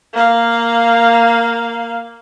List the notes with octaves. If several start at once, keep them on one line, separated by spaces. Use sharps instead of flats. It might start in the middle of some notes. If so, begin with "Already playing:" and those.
A#3 F5